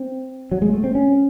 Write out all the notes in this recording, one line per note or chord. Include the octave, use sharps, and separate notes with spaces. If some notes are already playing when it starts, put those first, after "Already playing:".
Already playing: C4
F#3
G#3
A3
C4
C#4